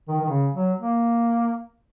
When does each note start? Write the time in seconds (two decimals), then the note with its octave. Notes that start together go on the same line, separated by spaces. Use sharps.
0.08 D#3
0.21 D#3
0.28 C#3
0.54 F#3
0.80 A#3